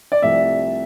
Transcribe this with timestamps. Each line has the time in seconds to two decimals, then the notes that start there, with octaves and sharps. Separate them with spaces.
0.12 D5
0.22 C2 C3 F3 A3 E5